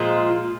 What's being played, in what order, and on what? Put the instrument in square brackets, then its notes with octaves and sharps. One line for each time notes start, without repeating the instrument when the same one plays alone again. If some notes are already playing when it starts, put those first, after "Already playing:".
Already playing: [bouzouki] A#2 F3 G#3